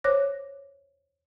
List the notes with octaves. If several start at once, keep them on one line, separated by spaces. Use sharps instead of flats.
C5 C#5 D6 F#6 A#6